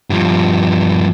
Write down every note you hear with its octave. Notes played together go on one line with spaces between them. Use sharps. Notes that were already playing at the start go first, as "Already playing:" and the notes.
G2 F3